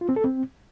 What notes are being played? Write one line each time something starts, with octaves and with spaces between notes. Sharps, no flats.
F4
C4
A4
C4